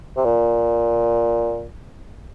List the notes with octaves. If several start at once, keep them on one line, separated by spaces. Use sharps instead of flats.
C3
A#2